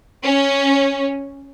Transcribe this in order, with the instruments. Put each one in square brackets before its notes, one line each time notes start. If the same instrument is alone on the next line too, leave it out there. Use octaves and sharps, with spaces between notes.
[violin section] C#4